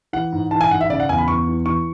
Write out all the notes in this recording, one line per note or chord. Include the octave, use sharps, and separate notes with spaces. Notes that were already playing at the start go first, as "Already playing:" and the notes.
E3 F#5
G#2
E3 A5
G#5
G#2 F#5
E5
C#3 D5
F#5
E2 G#5
B5
E2 C#6
E3
E3 C#6